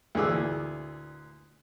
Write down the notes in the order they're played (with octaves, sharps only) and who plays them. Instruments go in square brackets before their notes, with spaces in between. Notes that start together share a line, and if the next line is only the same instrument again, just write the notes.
[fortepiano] D2 A#2 E3 G#4 D6 E6